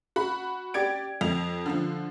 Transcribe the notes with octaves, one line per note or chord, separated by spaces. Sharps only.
F#4 B5
G4 D5 G#6 D7
F2 F7
D3 F3